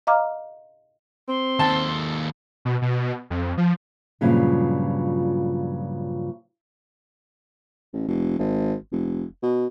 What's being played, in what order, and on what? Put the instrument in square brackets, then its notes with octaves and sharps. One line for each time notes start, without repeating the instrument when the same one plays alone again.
[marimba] D#5 F5 A#5 D6 F6
[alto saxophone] C4 [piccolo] C6
[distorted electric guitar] D#2 A4 [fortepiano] A5
[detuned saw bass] B2
B2
F2
F3
[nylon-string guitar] G2 A#2 C#3 F3 F#3 G#3
[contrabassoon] A1
F1
G#1
F1
B2